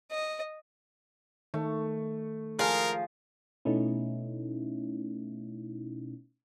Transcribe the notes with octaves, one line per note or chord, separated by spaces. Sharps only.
D#5
D#3 A3
F3 G#4 A#4 F5
B2 A3 B3 C#4 D#4 E4